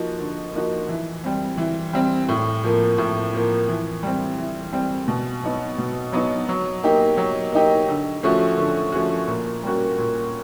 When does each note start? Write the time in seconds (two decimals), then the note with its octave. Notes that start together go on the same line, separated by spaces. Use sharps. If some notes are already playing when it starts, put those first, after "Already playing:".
Already playing: F3 A#3 D#4 F#4
0.19 D3
0.53 F3 A#3 D#4 F#4
0.88 E3
1.24 G3 C4
1.58 E3
1.93 G3 C4
2.29 A2
2.64 F3 A#3
2.98 A2
3.33 F3 A#3
3.68 E3
4.03 G3 C4
4.38 E3
4.73 G3 C4
5.08 B2
5.43 F#3 B3 D#4
5.78 B2
6.13 F#3 B3 D#4
6.49 F#3
6.83 A#3 D#4 G4
7.17 F#3
7.52 A#3 D#4 G4
7.88 D3
8.23 F3 A3 C#4 F#4
8.58 D3
8.92 F3 A3 C#4 F#4
9.27 A#2
9.63 G3 A#3 C#4 F#4
9.98 A#2